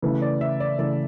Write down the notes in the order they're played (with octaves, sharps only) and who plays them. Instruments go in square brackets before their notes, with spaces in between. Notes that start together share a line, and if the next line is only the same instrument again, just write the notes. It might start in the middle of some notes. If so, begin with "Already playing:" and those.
[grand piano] C#3 E3 A3 B4
D5
E5
D5
C#3 E3 A3 D5